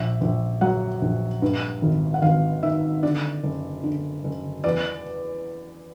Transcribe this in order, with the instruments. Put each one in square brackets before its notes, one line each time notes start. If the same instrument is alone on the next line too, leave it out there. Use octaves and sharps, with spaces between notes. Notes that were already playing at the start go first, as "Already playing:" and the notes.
Already playing: [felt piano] A#1 E5
A#1
F#3 F#5
A#1
G2
G#1
F#5
G#1 F5
D#3 E5
D3 D5
F#1
D3
F#1
E2 D5